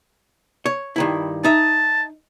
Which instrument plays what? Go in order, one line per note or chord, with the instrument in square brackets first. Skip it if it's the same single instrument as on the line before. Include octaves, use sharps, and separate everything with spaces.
[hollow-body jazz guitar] C#5
G2 D#3 E4
[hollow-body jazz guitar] D#4 E5 [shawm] A5